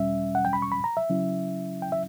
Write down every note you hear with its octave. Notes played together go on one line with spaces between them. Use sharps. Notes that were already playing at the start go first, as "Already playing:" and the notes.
Already playing: E2 B2 G3 C#4 E5
F#5
G5
B5
C#6
B5
A#5
E5
C#3 F#3 C#4 E4
G5
E5